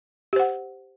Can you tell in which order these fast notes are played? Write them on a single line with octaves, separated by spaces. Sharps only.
G4 C5 F#5